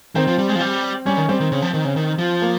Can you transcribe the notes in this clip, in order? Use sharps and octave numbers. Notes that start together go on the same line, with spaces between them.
D#3 C4
F3
G3
G#3
F3
G3
G3 C#4
D#3
G3 C4
D#3
C#3
F3
D#3
C#3
D#3
F3
A#3